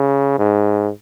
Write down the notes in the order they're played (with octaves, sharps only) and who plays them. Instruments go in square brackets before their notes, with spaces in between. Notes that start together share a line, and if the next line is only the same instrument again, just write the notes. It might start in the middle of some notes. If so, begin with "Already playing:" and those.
Already playing: [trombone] C#3
G#2